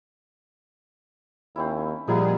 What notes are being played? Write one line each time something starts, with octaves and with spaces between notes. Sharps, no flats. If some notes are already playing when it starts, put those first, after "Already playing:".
D#2 C4 C#4 E4
A#2 F3 G3 D#4 E4 G#4 F#5